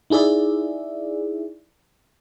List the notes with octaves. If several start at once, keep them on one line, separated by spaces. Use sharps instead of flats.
D#4 E4 G#4 D5 E5